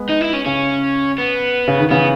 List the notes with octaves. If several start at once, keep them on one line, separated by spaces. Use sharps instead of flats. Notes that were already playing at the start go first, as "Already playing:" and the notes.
Already playing: G#3 B3
D#4
E4
C#4
C#3 C#4
B3
C#3
D#3
C#3 E3 B3